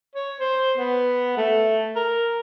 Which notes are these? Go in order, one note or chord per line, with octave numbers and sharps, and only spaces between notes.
C#5
C5
B3
A3
A#4